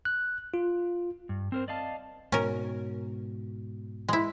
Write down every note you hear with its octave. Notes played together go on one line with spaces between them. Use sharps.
F#6
F4
G2
C4 A#4 C5
D5 D#5 F5 A5
G#2 B2 C#4 A#4
G#3 E4